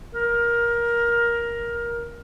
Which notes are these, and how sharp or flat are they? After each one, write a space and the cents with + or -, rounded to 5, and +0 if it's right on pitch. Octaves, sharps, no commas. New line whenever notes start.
A#4 +15